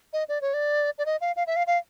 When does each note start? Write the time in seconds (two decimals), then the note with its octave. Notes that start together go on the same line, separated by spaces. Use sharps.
0.13 D#5
0.29 D5
0.42 C#5
0.54 D5
0.99 D5
1.06 D#5
1.21 F5
1.36 F5
1.47 E5
1.56 F5
1.67 F5